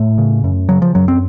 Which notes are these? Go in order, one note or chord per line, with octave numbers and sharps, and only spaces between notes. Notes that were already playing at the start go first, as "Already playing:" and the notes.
Already playing: A2 A3
C#3
F#2
C#3 F#3
F3
F#2 F#3
C4